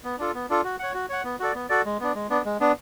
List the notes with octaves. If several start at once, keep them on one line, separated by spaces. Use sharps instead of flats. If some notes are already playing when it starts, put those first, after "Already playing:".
B3
D4 F4 A4
B3
D4 F4 A4
F#4
C#5 F#5
F#4
C#5 F#5
B3
F#4 A4 D5
B3
F#4 A4 D5
G#3
B3 D4
G#3
B3 D4
G#3
B3 D4